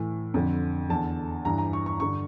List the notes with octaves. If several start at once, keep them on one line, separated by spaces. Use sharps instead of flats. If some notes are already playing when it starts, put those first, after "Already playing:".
Already playing: A2 E3
F2 D3
E2 D3 A5
G2 E3 A#5
A#5
C#6
C#6
G2 D3 C#6